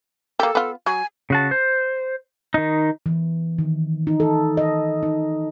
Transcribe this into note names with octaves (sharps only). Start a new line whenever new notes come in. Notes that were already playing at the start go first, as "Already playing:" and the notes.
A#3 G4 A4
B3 F4
F#3 G#5
C#3 F#4 A5
C5
D#3 D#4
E3
D#3
D#4
A4
D#5
D#4